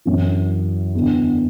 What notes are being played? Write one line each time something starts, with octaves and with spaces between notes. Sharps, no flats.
F#2 E3
E2 D3